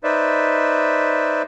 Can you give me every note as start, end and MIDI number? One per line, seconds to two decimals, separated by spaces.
0.04 1.42 63
0.04 1.42 71
0.04 1.42 72
0.04 1.42 74
0.04 1.42 76